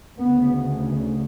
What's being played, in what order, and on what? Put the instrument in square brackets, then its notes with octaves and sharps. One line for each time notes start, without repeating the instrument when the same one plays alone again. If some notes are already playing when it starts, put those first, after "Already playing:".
[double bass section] D2 C#3 B3